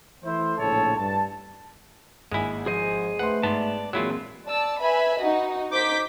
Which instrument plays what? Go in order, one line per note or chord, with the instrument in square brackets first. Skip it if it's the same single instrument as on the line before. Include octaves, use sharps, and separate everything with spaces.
[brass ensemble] E3 A3 E4 C5
A#1 A2 C#3 A4 C#5 A5
G2 A5
[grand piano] G#1 G#5 [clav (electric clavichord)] G#3 E4 [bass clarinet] A#3
[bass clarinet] F3 [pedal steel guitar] G#4 C5 D#5
[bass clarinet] A3 [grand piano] B4 C6 [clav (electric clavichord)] F#5
[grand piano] G#2 [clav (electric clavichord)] B3 [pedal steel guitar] D5 A5
[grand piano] A#2 G#3 C4 [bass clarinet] E3 [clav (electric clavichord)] F#3 E4 F4 [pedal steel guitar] E6
[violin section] D5 A5 E6
B4 E5 G#5 B5
D#4 F#4 D#5
D#4 C5 D6 G6 B6